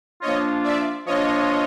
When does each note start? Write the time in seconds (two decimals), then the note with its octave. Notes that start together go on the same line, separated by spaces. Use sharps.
0.22 F3 A#3 D4 F4 C#5 D#5
0.63 D5 E5
1.06 F3 A#3 D4 F4 C#5 D#5